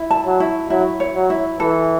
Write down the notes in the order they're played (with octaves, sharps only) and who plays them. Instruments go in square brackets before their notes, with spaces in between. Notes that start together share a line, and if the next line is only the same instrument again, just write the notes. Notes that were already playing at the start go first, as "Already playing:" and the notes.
Already playing: [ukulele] E4
A5
[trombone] F#3
[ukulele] E4
[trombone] F#3 [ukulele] E4
[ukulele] C#5
[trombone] F#3
[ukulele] E4
[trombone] E3 [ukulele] A4